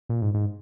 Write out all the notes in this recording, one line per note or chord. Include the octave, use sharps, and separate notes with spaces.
A#2
G#2
G#2